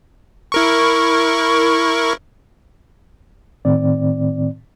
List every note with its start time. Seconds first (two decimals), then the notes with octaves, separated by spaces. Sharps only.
0.52 E4 A#4 C#6
3.65 A2 D#3 C4 D5